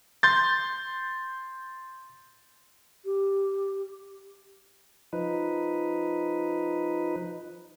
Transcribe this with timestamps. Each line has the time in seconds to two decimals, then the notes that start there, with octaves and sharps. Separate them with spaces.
0.23 C6 G6 A6
3.05 G4
5.13 F3 D#4 B4